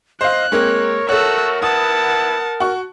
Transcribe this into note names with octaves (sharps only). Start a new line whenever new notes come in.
C5 D#5 F5 F#6
G#3 A#3 C4 A#4 C#5
A3 F#4 A4 C#5 E6 F#6
B3 E4 F#5 A5 D#6
F#4 C#6